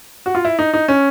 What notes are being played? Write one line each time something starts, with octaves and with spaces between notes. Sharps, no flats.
F#4
F4
E4
D#4
D#4
C#4